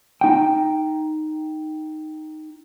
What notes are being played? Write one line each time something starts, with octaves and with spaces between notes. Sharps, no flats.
D#4 G5